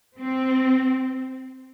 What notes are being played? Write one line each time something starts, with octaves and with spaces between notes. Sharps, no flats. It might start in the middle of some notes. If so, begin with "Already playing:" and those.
C4